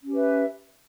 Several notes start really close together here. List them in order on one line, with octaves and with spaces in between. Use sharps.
C#4 G4 B4 E5